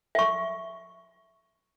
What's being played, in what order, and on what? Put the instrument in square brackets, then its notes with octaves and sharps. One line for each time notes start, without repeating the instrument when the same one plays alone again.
[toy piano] E5 C#6